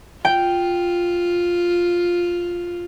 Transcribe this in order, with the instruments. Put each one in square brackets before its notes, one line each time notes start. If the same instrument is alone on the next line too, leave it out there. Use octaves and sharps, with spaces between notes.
[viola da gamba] F4 [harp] G5